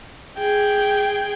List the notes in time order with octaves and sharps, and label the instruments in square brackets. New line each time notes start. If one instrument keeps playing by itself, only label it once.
[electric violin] G#4 G5